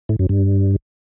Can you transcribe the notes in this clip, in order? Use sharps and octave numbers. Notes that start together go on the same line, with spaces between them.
A2
F#2
G2